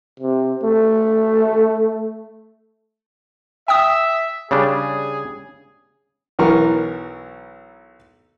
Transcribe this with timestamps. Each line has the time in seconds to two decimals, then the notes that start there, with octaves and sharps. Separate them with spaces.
0.20 C3
0.64 A3
3.68 E5 G5 D#6
4.51 C#3 G3 D4 G#4
6.39 B1 E3 A#4 C#6